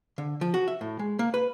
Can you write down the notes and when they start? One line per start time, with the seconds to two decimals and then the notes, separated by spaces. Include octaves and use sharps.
0.18 D3
0.41 F3
0.54 F#4
0.68 E5
0.81 A2
0.99 G#3
1.19 A#3
1.34 B4